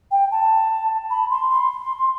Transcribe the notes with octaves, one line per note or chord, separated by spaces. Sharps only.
G5
A5
B5
C6
C6